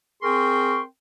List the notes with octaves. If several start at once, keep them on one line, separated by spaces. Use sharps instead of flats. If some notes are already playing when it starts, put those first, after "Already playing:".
C4 G#4 A#4 G5 C6 C#6